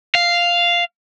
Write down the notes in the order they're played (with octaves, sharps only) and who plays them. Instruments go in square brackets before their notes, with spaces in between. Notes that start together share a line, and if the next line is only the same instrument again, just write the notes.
[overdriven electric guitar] F5